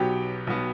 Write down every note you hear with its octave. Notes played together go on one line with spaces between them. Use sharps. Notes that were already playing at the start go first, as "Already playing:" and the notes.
Already playing: B1 B2 F#3 B3 G4 G5
B1 B2 F#3 B3